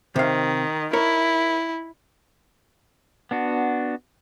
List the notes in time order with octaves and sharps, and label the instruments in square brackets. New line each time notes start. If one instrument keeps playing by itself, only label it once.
[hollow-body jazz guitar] C3 F5 [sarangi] D#3
[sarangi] E4 [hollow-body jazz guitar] A#4 C#5
[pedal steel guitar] B3 D4 F#4